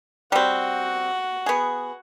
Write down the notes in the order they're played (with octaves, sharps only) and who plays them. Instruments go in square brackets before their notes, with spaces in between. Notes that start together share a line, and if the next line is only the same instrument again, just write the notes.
[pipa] G3 C4 [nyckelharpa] F#4 F#5
[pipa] B3 G#4